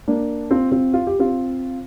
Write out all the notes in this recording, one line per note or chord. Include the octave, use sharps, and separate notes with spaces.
A#3 D4
C4 F4
C4 F4
F4
G4
C4 F4